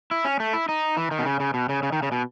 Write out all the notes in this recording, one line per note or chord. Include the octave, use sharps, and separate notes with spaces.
E4
C#4
A3
E4
D#4
E3
D#3
B2
C#3
C#3
B2
C#3
C#3
D#3
C#3
B2